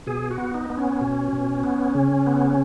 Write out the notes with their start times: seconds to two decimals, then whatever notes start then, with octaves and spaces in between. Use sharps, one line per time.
0.07 B2 G#4
0.30 F#4
0.38 B3
0.54 D#4
0.70 B3
0.77 C#4
1.01 B2
1.32 B2
1.63 B3
1.95 C#3
2.26 B3